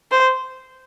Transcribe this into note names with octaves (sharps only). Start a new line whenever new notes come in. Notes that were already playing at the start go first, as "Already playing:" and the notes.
C5